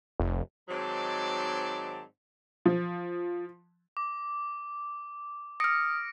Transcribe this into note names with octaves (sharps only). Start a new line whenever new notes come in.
F1
G#2 D#3 F#3 C4 D5 A5
F3
D6
D#6 F6 A#6 C#7 D7